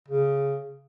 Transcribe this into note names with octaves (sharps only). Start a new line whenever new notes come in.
C#3